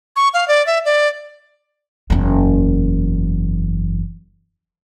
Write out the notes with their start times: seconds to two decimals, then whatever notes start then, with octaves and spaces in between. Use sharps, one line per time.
0.16 C#6
0.34 F5
0.48 D5
0.66 E5
0.85 D5
2.10 F#1 E2